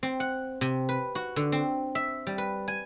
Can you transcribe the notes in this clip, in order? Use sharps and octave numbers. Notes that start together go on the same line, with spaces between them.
C4
F#5
C3
B4
F#4
D3
C4
E5
G3
B4
G#5